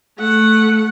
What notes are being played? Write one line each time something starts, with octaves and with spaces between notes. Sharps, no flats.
A3 F#5